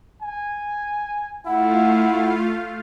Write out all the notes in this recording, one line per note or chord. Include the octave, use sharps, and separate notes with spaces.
G#5
A3 E4 F4 F5 F#5